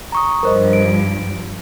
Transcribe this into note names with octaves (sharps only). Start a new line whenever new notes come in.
A#5 C#6 D#6
G2 F3 A#4 C5 D#5
D7